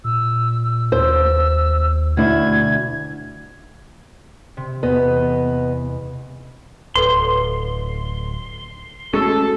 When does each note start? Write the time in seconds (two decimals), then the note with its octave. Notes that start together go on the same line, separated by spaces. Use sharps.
0.04 A#2 E6
0.63 E6
0.92 D#2 C5 E6
2.17 D2 B2 E4 G#6
4.57 C3
4.83 E2 B3 D#5
6.95 D1 A4 B4 C#5 C6
9.13 G#3 A3 C#4 F#4 G#4 A4 C#6